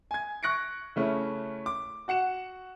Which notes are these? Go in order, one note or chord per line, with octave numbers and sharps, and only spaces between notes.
G#5 G#6
C#6 F#6 A#6 C#7 D7
C#3 A3 C#4 E4
D6
F#4 F#5 C#7 E7